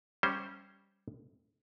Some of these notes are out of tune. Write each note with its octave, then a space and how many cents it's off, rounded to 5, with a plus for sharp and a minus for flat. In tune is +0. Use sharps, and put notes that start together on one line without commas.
G3 +0 C#4 -5 C5 +0